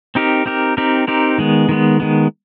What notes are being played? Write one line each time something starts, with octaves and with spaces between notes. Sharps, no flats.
C4 D#4 G4 A#4
C4 D#4 G4 A#4
C4 D#4 G4 A#4
C4 D#4 G4 A#4
D#3 G#3 B3
D#3 G#3 B3
D#3 G#3 B3